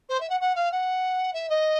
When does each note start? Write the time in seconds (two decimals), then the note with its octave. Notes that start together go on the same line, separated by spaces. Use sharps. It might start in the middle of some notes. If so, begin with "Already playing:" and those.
0.09 C5
0.20 E5
0.29 F#5
0.40 F#5
0.55 F5
0.71 F#5
1.33 E5
1.49 D#5